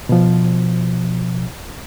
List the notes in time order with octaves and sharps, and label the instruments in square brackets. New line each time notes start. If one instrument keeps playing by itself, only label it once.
[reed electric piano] B2 F3